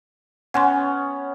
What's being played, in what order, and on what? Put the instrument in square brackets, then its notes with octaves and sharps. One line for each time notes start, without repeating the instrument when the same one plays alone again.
[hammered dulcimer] B3 C#4 [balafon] F#5 G#5 C6